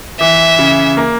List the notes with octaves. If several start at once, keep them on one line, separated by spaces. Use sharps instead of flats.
E3 E5
C#3
A#3